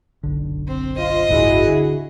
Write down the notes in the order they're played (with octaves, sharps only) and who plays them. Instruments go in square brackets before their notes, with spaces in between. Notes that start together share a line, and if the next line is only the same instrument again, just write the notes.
[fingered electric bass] F#1 B1 D3
[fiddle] C4
[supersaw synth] F4 C5 [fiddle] D#5
[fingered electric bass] G1 D2 A2 [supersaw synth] E4 F#4 G#4
[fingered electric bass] D3